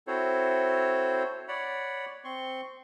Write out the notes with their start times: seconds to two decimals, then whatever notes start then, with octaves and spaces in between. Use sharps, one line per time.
0.07 C4 E4 F#4 A4 C5 C#5
1.48 C#5 D5 F#5 B5
2.24 C4 C6 C#6